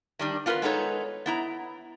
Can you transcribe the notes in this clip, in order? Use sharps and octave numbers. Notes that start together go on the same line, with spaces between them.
D#3 G3 D4
B3 F4 G4 A#4 B4
G#3 B3 D#4 A4 C#5
B3 E4 A#5